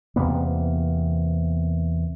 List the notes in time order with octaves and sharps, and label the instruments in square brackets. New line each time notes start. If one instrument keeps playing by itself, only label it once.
[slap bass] E2 C3 A#3 B3